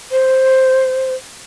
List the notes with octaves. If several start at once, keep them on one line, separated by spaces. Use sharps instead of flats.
C5